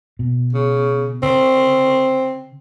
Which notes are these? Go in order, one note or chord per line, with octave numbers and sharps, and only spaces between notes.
B2
C#3
C#3 C4